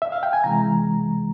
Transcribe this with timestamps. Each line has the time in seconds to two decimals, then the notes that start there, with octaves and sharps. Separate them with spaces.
0.02 E5
0.12 F5
0.23 G5
0.33 G#5
0.44 C3 E3 G#3 A#5